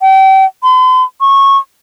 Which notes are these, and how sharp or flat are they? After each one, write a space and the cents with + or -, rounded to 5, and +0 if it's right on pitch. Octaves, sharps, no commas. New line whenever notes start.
G5 -35
C6 -45
C#6 -15